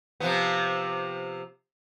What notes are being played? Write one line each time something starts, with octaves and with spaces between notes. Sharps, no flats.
C3 F3 B3